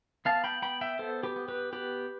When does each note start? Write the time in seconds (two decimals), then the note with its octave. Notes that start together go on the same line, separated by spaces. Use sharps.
0.25 B3 F5 A5
0.44 G5 B5
0.62 B3 G5 B5
0.81 E5 G5
0.99 B3 A4 C5
1.23 G4 B4
1.36 B3
1.48 G4 B4
1.73 B3 G4 B4